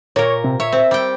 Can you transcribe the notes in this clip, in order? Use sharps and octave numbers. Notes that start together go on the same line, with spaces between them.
A#2 A#4 C#5
C3
C#5 E5
C4
G3 G5